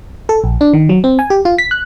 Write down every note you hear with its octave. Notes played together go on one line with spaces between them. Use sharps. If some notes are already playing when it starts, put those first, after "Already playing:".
A4
A#1
D4
D#3
F#3
C4
G#5
G4
F4
B6
F#6